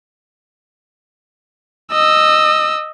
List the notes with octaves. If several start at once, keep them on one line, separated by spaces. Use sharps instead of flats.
D#5 E6